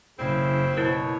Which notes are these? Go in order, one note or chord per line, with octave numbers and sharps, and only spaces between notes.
F#1 C#3 C4 E4
B2 E4 A#4 C#5